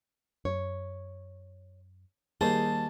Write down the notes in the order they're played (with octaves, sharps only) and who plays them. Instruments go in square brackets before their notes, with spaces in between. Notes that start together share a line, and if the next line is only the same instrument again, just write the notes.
[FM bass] F#2 [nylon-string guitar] C#5
[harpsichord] D#2 D#4 [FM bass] G3 [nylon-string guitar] G#4 C5 [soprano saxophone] A5